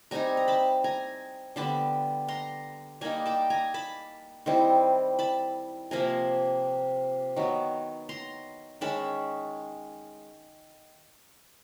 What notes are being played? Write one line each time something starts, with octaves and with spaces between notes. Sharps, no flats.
G3 C4 D#4 G#5 A#5
A#5
A5 B5
G#5 A#5
D3 G3 B3 A5 B5
A#5 C6
G3 A#3 D#4 G#5 A#5
G5 A5
G#5 A#5
A5 B5
D#3 G3 C4 E4
A5 B5
C3 F3 A#3 G#5 A#5
D#3 F#3 B3
A#5 C6
D#3 G#3 C#4 A5 B5